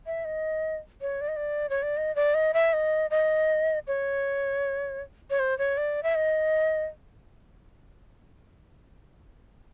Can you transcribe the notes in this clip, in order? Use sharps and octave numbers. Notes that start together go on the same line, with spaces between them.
E5
D#5
C#5
D5
D#5
D5
C#5
D5
D#5
D5
D#5
E5
D#5
D#5
C#5
C#5
C5
C#5
D5
E5
D#5